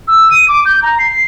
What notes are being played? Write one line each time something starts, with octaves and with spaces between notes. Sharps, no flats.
E6
D#7
D6
G6
A#5
C7